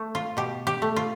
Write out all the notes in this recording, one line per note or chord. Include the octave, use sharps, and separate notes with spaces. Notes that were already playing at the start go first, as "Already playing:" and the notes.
Already playing: A3
F4
B2 G4
G4
A3
F4